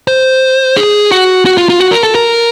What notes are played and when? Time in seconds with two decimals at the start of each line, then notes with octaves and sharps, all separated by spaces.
0.08 C5
0.77 G#4
1.11 F#4
1.46 F#4
1.57 F4
1.69 F4
1.81 F#4
1.91 A#4
2.03 A4
2.15 A#4